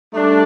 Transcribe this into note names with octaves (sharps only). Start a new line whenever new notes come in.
G3 A3 D4